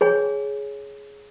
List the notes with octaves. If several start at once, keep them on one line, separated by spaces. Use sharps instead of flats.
G#4 C#5 G#5